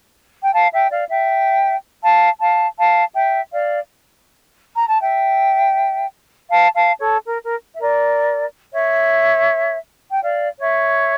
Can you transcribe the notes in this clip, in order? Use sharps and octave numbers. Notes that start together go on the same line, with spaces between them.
G5
F5 A5
E5 G5
D5 F5
E5 G5
F5 A5
F5 A5
F5 A5
E5 G5
D5 F5
A#5
A5
E5 G5
F5 A5
F5 A5
A4 C#5
A#4
A#4
E5
A#4 D5
C#5 E5
G5
D5 F5
C#5 E5